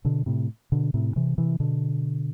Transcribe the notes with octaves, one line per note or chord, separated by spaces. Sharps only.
B2 D3
A2 C3
B2 D3
A2 C3
C3 E3
C3 E3
B2 D3